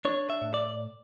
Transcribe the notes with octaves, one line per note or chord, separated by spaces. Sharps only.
D4 C#5
E5
A2
D5